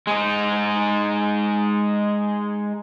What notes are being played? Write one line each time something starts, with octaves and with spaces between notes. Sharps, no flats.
G#3 D#4